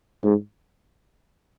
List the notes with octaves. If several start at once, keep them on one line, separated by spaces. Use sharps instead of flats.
G#2